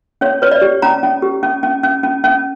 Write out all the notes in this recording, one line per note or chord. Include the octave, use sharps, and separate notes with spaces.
C#4 C#5
B4 C#5
D5
G4
C#4 A#5
C#4
G4
C#4
C#4
C#4
C#4
C#4